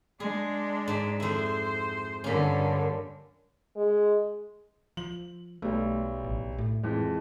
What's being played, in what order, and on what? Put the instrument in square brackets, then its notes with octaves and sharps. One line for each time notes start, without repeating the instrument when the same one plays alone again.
[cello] G#3 D4 [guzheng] G#4
[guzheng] G#2 G4
[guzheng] F2 E4 [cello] C5
[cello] G2 D3 [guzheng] A#3 C#4
[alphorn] G#3
[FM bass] F3 [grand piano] F#7
[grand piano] B1 G3 [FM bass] A3
[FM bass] A1
A2
[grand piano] F2 E3 G#3